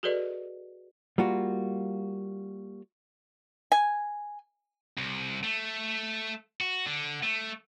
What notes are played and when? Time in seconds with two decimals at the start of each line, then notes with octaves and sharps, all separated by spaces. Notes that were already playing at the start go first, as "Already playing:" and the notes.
0.03 F#4 G#4 A4 B4 D5 D#5
1.18 G3 A#3 F4 F#4
3.72 G#5
4.98 C2
5.43 A3
6.61 F#4
6.86 D3
7.23 A3